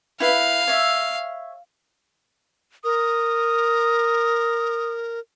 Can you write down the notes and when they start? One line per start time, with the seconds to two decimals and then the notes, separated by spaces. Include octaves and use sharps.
0.20 E4 B4 F5
0.68 C#5 E5
2.84 A#4 D#6